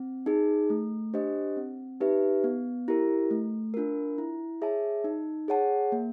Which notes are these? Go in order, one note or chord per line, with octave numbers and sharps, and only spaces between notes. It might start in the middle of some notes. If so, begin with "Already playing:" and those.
Already playing: C4
D#4 G#4
A3
D4 G4 C5 D#5
C4
D#4 G4 B4 E5
B3
E4 G4 A#4
A3
D4 F4 A#4
E4
G#4 C#5 E5 A5
D#4
G#4 C#5 F#5 A5
A#3